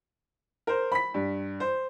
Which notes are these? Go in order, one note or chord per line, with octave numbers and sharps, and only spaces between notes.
A#4 C5
B5 B6
G2
C5